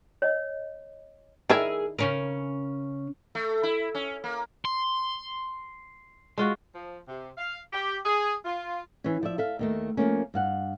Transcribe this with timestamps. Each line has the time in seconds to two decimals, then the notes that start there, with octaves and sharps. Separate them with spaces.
0.22 C#5 D#5
1.50 D#3 D4 E4 G#4 A#4 E5
1.99 C#3 C#4 A#4
3.35 A3
3.63 E4
3.95 C#4
4.24 A#3
4.65 C6
6.38 G#3 F4 F#4
6.75 F3
7.08 C3
7.38 F5
7.72 G4
8.06 G#4
8.45 F4
9.04 E3 C#4
9.23 F3 D5 E5
9.38 A4 E5 F5
9.59 D#2 D#3 A3
9.97 F3 A3 A#3 C#4
10.34 G2 F5 F#5